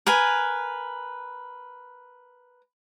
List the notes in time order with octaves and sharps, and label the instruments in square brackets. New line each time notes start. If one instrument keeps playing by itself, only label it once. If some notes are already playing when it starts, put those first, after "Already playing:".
[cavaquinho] A#4 B4 G#5